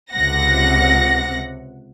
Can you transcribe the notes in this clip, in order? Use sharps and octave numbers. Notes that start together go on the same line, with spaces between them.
C#2 C3 F#5 A#6